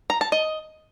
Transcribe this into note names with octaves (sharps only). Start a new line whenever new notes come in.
A#5
A5
D#5